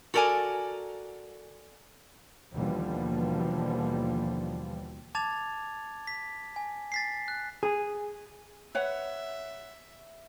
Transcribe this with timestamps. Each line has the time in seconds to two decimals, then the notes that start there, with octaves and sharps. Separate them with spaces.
0.14 F#4 A4 A#4 D5 G#5
2.54 D#2 B2 D3 E3 F3 G3
5.15 A5 D6 G#6 A6 F7
6.07 B6
6.56 G#5
6.92 A6 B6 C7
7.28 F#6
7.63 G#4
8.75 B4 C#5 E5 F#5